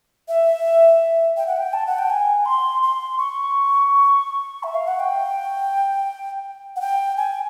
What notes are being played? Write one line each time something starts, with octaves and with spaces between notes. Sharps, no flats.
E5
G5
F#5
G5
A5
F#5
G5
G#5
C6
C6
C#6
E5
F5
F#5
G5
F#5
G5
G#5